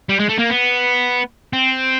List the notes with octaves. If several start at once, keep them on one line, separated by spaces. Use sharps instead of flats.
G3
G#3
A3
A#3
B3
C4